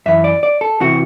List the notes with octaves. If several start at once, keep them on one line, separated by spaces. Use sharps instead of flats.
F#2 E3 E5
D5
D5
A4
C3 E3 F#4